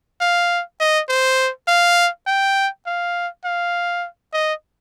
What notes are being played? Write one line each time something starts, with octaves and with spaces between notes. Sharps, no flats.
F5
D#5
C5
F5
G5
F5
F5
D#5